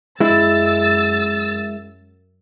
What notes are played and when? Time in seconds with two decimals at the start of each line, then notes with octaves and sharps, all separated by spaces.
0.20 F#2 G#3 E4 E6 A6